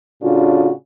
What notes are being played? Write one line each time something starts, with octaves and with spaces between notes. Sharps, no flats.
A2 C#3 D4 F4 F#4